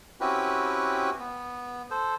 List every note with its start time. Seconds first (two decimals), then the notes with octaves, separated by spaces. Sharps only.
0.21 C4 C#4 E4 F#4 G4 B4
1.19 B3
1.91 A4 C5